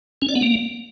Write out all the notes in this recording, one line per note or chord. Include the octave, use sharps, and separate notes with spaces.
C#4
D5
B3
A#3